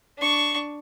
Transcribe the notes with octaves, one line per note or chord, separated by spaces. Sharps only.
D4 C#6